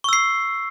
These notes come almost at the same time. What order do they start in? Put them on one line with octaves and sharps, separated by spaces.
C#6 E6 C7